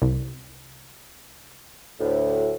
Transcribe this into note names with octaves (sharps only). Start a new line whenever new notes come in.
C2
D2 A2